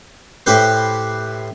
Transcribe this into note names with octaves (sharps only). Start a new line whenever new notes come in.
A2 G4 B4 C5